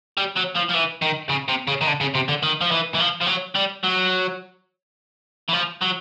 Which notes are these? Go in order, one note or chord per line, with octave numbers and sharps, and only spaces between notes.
G3
F#3
F3
F3
E3
D#3
C#3
C3
C#3
D#3
D3
C#3
C3
D3
D#3
F3
E3
E3
F3
F3
F#3
G3
F#3
E3
F3
F#3